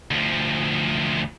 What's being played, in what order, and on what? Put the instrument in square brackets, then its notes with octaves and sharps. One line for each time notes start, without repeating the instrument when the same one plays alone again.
[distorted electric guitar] D2 F3